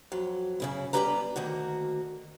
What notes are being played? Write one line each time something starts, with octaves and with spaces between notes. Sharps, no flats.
F2 F#3
F#2 C#3 E4
G3 B3 D4 G4 B4 A#5
D2 D#3 A#3 F#4